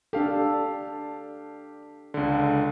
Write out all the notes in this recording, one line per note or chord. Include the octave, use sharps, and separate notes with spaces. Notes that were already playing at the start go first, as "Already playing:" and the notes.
D4 G4 A4 F5
C#2 D3